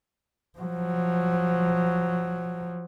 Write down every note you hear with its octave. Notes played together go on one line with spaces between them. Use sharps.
F3 F#3